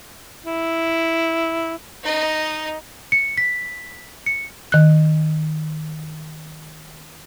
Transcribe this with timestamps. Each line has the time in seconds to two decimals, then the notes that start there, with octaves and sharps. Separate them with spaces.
0.46 E4
2.03 D#4 D#5
3.12 C#7
3.37 B6
4.26 C#7
4.72 D#3 F#6